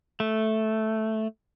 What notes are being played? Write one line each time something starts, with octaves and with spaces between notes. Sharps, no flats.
A3